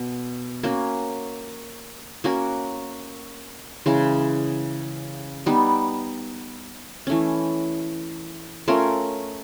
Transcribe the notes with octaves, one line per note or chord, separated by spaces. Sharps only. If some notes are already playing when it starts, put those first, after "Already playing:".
Already playing: B2
A#3 C#4 F#4
A#3 C#4 F#4 A#4
C#3 E3 G#3
G3 B3 D#4
E3 A3 C#4
A3 C#4 F4 A#4